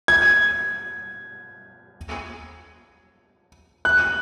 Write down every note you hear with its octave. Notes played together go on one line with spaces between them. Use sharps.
G#6
F#6